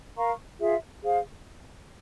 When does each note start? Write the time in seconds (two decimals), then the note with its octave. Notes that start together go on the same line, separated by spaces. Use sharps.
0.16 A#4 F5 A#5 C#6
0.59 F4 G#4 E5
1.03 G#4 C5 F5